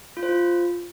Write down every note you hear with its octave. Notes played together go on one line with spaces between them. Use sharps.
F4
C5
F4